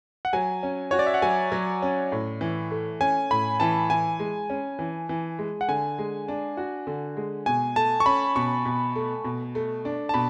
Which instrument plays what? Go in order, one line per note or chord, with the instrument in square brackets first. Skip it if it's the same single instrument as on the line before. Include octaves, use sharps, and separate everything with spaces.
[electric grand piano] F#5
[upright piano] F#3 [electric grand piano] G#5
[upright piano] C#4
[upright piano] F#4 [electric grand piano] C#5
[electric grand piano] D5
E5
F#5
[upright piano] F#3 [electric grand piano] G#5
[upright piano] F#3
C#4
A2
E3
A3
[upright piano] C#4 [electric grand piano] G#5
[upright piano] A2 [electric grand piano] B5
[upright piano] E3 [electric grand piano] A5
[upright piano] E3 [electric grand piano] G#5
[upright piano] G#3
C#4
E3
E3
G#3
[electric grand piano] F#5
[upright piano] D3 [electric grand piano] G#5
[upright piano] G#3
D4
F#4
D3
G#3
[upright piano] B2 [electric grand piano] G#5
[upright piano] A3 [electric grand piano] A5
[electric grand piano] C#6
[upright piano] C#4 [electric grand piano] B5
[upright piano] B2 [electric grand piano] C#6
[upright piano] B2
A3
B2
A3
D4
[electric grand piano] A5
[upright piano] B2 [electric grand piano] B5